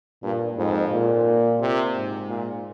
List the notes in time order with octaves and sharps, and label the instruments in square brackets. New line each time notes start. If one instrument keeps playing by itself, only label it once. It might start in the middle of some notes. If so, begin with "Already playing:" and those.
[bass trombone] G2 [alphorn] A#2
[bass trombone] F2 [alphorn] G#2
[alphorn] A#2
[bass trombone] C3
[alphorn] G#2
[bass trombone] A#2